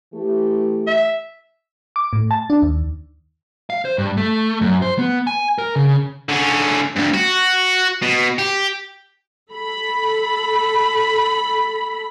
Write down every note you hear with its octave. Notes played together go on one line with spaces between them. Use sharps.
E3 A3 G4
E5
D6
A2
A5
D4
D#2
F5
C5
G2
A3
F#2
C5
B3
G#5
A#4
C#3
D3 C#4
D2 G2
F#4
B2
G4
A4 B5